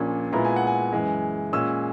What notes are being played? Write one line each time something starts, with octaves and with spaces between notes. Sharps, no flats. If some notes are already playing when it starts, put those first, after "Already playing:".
Already playing: A#1 A#2 A#3 C#4
A#2 G#3 B3 E4 A#5
G#5
F#5
G#5
F#2 E3 G#3
A#2 G#3 C#4 E6